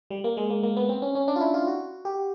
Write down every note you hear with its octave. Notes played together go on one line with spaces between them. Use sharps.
G3
A#3
G#3
A#3
A#3
B3
C4
C#4
C#4
D4
F4
E4
F4
F#4
G4